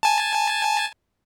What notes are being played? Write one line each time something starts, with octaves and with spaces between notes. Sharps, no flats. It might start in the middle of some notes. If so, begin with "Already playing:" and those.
G#5 A5